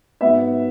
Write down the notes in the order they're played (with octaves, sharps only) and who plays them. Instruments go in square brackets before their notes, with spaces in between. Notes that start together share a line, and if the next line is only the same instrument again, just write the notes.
[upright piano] G#2 F#3 B3 E5